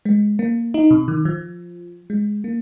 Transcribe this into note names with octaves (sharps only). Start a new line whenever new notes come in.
G#3
A#3
D#4
C3
D#3
F3
G#3
A#3